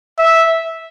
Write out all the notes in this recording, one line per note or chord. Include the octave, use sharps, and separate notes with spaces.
E5